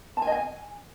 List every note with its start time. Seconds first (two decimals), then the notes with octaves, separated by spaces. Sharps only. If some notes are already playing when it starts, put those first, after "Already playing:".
0.17 A5
0.22 G#5
0.27 D#5
0.32 G#5